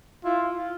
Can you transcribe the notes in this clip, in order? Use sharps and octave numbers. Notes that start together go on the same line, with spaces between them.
E4 F4
F4